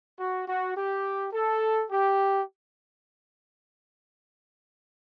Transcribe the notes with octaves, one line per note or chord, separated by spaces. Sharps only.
F#4
F#4
G4
A4
G4